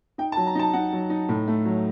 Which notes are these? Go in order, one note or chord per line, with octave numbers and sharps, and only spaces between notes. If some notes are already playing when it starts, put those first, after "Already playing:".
D#4 G5
A5
F#3
A#5
D#4 A5
D#4 F#5
F#3
D#4
A2
A3
F#3